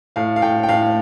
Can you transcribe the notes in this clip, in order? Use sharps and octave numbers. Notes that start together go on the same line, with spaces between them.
A2 F5
F5
A2 G5
G5
A2 F5